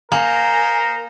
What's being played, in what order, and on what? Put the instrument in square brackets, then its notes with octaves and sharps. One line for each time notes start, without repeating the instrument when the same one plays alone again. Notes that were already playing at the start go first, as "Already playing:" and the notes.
[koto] A#3 [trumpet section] D#4 C5 A#5 [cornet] A#4 [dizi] G#5